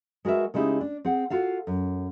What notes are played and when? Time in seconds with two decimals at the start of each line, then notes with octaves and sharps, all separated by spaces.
0.25 G#3 F#4 A#4 B4 E5
0.54 C#3 G#3 D#4 E4 G4
0.81 D4
1.05 C4 G#4 F#5
1.30 F4 F#4 A4 F5
1.67 F#2